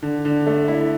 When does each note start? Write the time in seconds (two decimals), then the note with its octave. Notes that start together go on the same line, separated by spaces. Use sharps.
0.02 D3
0.25 D3
0.47 A3
0.68 E4